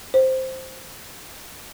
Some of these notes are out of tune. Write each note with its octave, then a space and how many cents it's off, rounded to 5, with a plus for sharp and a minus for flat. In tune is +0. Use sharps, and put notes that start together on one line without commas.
C5 +0